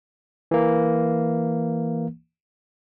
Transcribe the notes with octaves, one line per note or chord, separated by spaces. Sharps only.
E3 A#3